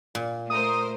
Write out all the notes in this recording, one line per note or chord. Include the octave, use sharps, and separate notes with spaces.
A#2
A3 A#4 C5 D#6